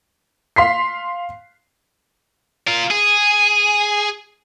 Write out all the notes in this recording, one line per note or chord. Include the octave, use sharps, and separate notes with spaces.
F5 C6 B6 C7
F4 A#4
G#4